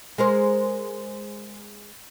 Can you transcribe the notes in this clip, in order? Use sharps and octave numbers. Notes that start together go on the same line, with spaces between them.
G#3 A#4 C5